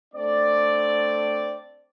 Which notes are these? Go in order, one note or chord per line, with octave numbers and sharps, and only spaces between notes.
A3 C4 D4 D5